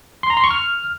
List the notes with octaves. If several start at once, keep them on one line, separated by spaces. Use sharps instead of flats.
C6
A#5
C6
C#6
F6